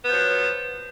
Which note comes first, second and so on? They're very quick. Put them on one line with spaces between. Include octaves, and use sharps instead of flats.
B3 F3 F#3